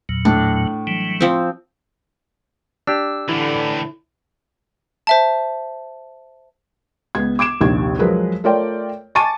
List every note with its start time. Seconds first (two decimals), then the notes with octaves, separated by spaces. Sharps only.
0.09 E2 A#2 F#3
0.25 A2 D4
0.87 E3 F#3 G3
1.21 F3 C4
2.87 D4 G4 E6
3.29 A2 D3 E3 E4
5.07 C5 E5 A5
7.15 C#2 B3 G#6
7.39 D6 G#6 D7 E7
7.61 A#1 D#2 C3 G#6
7.99 F3 F#3 G#3 G#4 A#4 B4
8.44 A3 F4 A#4 C#5 D5 G5
9.15 G#5 A5 C#6 D6 A6 D#7